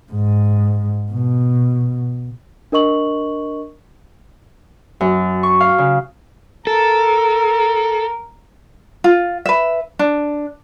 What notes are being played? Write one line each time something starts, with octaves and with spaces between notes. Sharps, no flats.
G#2
B2
D4 A#4 D#5 C#6 F#7
F#2
C#6
F5
C#3
A4 A#4
F4
B4 E5
D4